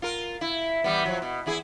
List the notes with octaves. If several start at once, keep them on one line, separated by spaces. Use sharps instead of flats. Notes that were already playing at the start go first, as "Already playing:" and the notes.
F4 A#4
E4
E3 G3 B3
F3 F#3
B2
E2 E4 G#4